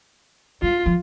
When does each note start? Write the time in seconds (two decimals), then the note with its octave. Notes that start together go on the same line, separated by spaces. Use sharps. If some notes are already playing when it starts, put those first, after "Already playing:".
0.62 G3 F4
0.86 F3